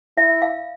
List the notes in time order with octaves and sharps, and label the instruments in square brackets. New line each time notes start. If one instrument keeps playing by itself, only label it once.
[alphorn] E4 [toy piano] E5
[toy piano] F5